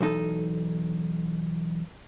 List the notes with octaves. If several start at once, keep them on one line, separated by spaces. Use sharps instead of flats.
B1 E2 D#4 A4